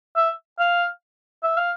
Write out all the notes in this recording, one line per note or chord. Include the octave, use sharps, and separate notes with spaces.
E5
F5
E5
F5